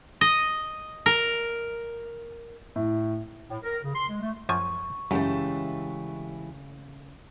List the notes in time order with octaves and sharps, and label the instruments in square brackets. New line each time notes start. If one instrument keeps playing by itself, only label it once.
[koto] D#5
A#4
[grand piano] A2
[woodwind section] A2
A#4
C#3
C6
G#3
A3
[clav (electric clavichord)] F#2 F3 G#5 [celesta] C#6
[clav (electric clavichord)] F#2 [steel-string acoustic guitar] C#3 A3 A5 [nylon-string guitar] E3 G#3 G4